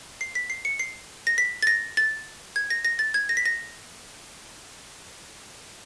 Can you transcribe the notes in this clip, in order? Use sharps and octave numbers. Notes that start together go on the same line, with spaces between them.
C7
B6
C7
C#7
C7
A#6
B6
A6
A#6
A6
G#6
A#6
A#6
A6
G#6
A#6
B6
A#6